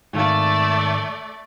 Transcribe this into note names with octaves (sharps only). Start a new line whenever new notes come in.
G#2 D#3 A3 D5 F5